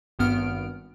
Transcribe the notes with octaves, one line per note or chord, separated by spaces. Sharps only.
G#1 G2 B3 F6 D7